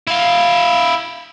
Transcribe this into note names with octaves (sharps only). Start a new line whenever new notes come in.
E4 F5